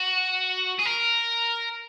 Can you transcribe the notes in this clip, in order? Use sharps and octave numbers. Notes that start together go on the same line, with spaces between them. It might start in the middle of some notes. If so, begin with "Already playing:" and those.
Already playing: F#4
G#4
A#4